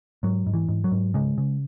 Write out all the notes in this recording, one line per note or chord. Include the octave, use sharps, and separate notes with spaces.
G#2 F#3
G#2
E3
G#2
F#3
G#2
C#3 G#3
C#3